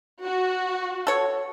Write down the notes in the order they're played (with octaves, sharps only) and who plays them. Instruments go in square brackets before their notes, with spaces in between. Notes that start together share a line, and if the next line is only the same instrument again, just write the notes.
[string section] F#4
[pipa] A4 C#5